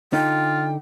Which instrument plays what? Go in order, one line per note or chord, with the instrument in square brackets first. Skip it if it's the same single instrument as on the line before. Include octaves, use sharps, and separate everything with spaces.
[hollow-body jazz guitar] D3 D#4 [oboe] F4 [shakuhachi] G5